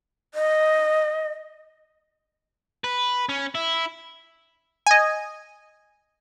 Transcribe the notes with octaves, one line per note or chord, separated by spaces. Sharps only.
D#5
B4
C#4
E4
D#5 G#5